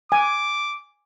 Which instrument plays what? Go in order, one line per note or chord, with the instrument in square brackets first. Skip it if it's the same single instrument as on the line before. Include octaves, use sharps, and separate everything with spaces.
[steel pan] G#5 [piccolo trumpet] D6